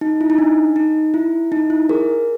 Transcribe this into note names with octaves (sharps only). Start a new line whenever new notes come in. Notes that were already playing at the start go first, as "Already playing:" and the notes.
D#4
E4
D#4
D4
D#4
E4
D#4
E4
G#4 A#4